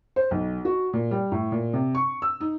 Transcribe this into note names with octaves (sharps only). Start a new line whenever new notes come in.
C5
B1
F#4
A#2
G3
A2
A#2
C3
C#6
E6
D#4